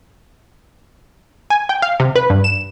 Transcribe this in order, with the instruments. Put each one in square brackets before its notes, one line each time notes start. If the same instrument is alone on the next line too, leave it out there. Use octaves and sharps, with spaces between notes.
[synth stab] G#5
G5
F5
C3
B4
G2
E7